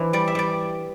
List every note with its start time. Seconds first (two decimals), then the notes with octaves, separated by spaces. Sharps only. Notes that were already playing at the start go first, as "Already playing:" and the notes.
Already playing: E3 D4 C5
0.13 G3 D5
0.28 E5
0.35 G3 D5